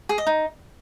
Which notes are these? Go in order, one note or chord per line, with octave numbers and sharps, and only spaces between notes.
G#4
D#5
D#4